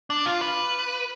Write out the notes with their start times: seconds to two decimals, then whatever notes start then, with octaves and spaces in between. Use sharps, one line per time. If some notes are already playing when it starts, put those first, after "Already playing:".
0.10 D4
0.26 F4
0.41 B4